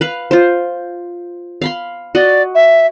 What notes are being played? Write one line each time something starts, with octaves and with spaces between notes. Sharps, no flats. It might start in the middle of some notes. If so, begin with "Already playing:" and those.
B4 F5
F4 C5
F5 B5 C6
F#4 D5 D#5
E5